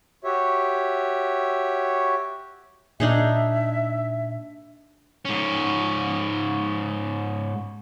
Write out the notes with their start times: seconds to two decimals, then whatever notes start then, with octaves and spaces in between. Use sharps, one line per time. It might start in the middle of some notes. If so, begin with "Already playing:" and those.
0.24 F#4 G4 C#5 E5
3.00 A#2 D4 D#4 G#4 E5
5.25 G#2 C#4